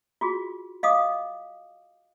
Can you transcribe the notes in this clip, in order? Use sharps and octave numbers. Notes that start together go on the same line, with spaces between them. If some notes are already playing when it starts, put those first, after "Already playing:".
F4 F#4 G#4
D#5 F5 D6 D#6